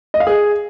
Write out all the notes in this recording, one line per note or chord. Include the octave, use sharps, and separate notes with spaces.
D#5
F5
G#4